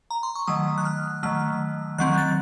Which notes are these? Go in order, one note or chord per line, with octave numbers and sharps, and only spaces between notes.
A#5
C6
C#6
D#3 F#3 A3 D#6
F#6
F6
D#3 F#3 A3 F6
D#3 F#3 C4 F#6
A6